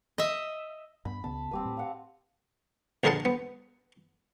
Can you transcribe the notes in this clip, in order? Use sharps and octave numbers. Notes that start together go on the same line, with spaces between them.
D#5 E5
G2 B3 B5
C#2 C#3 B3 A5
D#1 G3 A#3 C4 G4 B4
A2
F5 F#5
A#1 D3 G#4 A#4 F#5 A5
B3